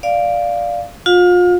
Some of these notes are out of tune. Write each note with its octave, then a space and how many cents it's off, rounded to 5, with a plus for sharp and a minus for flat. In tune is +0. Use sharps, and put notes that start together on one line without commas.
D5 +0 F5 +0
F4 +30 F5 +40